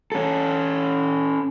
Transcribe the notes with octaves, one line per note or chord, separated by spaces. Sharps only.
C#4 A4